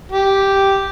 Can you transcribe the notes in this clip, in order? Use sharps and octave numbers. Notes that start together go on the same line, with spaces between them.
G4